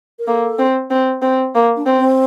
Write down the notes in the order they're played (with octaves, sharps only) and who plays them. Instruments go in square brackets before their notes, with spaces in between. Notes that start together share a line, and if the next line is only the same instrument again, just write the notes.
[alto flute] A#4
[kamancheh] A#3 [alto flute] A4
[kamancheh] C4
C4
C4
A#3
[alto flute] D4
[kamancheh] C4
[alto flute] C4